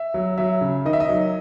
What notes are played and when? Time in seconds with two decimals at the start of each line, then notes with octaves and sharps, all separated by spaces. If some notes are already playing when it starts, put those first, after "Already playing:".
Already playing: E5
0.14 F#3
0.38 F#3 E5
0.61 C#3
0.85 D#3 D#5
0.93 E5
1.00 D#5
1.09 F#3